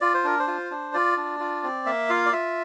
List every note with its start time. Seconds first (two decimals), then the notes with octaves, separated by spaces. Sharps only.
0.01 F4 D5
0.14 C5
0.24 D4 A#4
0.39 C5
0.47 F4
0.71 D4
0.94 F4 D5
1.17 D4
1.40 F4
1.63 C4
1.86 A#3 E5
2.09 F4 F5
2.26 D5
2.32 F4 E5